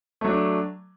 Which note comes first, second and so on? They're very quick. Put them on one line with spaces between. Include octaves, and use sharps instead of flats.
A3 F#3 D4